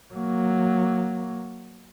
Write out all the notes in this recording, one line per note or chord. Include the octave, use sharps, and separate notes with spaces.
F#3 A#3